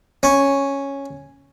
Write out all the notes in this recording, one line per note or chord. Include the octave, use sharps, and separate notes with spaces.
C#4